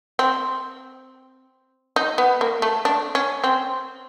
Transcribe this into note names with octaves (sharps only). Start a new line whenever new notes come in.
C4
D#4
B3
A#3
A3
D4
C#4
C4